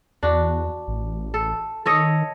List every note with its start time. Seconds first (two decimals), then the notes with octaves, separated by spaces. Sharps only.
0.23 E2 D4 F#4
0.88 A1
1.34 A4
1.86 D#3 A4 C#5 D#5